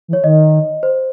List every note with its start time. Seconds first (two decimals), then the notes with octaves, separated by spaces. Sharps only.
0.08 E3
0.13 C#5
0.23 D#3 D#5
0.83 C5